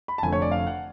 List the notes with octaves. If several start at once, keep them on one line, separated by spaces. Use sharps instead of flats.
B5
A5
F1 F2 D3 F3 A3 G#5
C#5
D5
F5
F#5